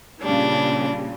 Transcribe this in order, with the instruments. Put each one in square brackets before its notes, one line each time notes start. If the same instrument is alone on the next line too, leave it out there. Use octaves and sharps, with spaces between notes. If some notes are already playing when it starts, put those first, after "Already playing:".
[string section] A#2 C#3 G3 [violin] D4